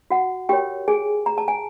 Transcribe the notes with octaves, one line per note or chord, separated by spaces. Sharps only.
F#4 F#5
F#4 G4 A#4 C#5 G5
G#4 G#5
A#5
A5
G#5